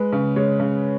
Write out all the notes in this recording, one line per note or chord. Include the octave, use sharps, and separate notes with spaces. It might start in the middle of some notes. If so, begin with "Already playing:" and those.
Already playing: G#3 B4
C#3
G#3 C#5
C#3